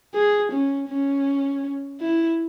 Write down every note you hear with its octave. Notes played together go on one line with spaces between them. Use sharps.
G#4
C#4
C#4
E4